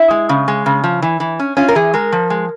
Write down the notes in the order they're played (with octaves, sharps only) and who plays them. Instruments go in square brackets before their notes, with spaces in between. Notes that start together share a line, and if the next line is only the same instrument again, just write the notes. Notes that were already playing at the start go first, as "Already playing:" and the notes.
Already playing: [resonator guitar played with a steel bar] E4
G#3
C#3
G#3
C#3
F3
E3
E3
C#4
C#4 F4
A#4
E3 G#4
G#3 A#4
F3
G#3